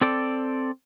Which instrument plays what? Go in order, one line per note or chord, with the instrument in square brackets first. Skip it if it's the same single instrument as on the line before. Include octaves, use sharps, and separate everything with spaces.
[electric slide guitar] C4 A4 D5